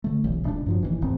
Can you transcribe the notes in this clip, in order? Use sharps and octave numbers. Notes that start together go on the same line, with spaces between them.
D3 A3
D#1 B1 E3
D#1 C#2 C#4 D4
G2 F3 F#3
E1 D#2 E3
F#1 E2 A2 C4